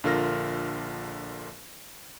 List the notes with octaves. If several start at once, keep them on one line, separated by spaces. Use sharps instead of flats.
A#1 D3 F4 A#4 F6 A#6